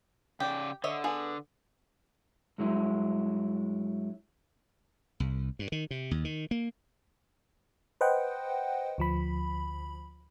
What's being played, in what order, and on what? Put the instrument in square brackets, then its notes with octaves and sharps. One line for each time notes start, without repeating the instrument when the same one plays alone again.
[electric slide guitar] C#3 D5 [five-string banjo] G4
[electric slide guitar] D3 [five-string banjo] C#5 D#5 E5
[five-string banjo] B3 G#4
[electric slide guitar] G2 F#3 G#3 E4
[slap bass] C2
G2
D#3
C3
D#2
D#3
A#3
[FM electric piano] B4 C5 D#5 F#5 G5
D2 F3 B5